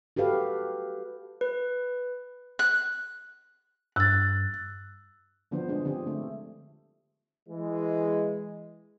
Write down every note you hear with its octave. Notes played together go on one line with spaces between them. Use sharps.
F#4 G4 A4 B4 F5
B4
F#6
G2 E6 F#6 A6
D3 F3 B3 D4 C5
G#3 D4 G#4
D3 C4 D4 F4 G4 G#4
A3
E3 G#3